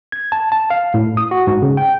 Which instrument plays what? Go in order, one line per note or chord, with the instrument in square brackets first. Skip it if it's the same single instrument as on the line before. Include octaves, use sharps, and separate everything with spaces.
[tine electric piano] G#6
A5
A5
F5
A2
D#6
F#4
G#2
C#3
G5